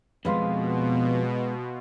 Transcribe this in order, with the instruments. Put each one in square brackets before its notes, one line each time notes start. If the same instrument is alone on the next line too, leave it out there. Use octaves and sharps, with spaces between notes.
[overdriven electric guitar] F2 [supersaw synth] B2 [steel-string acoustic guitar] G#3 B3 [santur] B4 F5 C6